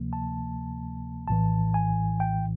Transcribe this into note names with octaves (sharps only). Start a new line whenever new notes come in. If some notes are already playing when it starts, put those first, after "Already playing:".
Already playing: D2 C3 F3 A#3
A5
A#1 A2 E3 A5
G#5
G5